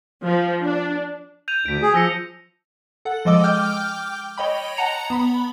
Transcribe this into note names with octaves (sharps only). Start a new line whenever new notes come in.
F3
D4
G6 D#7 F7
D2 B6 D7
G#4
F3 E6 A#6 C#7
A4 F#5
F3 G#3 D#5 D6 E6
G5 D6 F6 G6
C#5 D#5 G5 B5
F#5 A5 A#5 C#7 F7
B3 B5